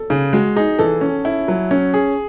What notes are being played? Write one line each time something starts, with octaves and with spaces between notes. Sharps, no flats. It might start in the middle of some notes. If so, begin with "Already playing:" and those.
Already playing: A4
C#3 G#4
G#3 F#4
D#4 G#4
E3 A4
C#4
E4
F#3
C#4
G#4